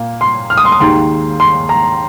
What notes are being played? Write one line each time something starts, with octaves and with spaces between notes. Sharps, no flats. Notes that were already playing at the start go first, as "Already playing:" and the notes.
Already playing: A#2 A#3
C6
F6
D#6
C6
D#6
D#2 D#3 G#3 C6
C6
A#5